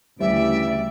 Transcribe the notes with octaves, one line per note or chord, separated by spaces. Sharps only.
D2 C#3 E3 G3 G4 D5 E5